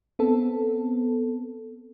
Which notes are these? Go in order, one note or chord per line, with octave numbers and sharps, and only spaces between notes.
B3 C4 A4